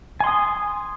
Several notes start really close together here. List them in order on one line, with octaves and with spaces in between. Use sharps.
G#5 C6 D#6